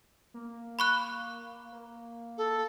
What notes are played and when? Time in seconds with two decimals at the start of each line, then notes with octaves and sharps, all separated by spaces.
0.34 A#3
0.79 B5 C#6 F#6
1.72 A#3
2.38 A4